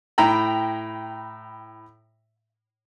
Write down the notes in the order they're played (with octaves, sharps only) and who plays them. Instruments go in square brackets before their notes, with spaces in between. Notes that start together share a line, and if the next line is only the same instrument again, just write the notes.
[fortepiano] A2 G5 A#5 B5